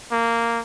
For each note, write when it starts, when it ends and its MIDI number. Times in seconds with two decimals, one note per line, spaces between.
0.12 0.60 58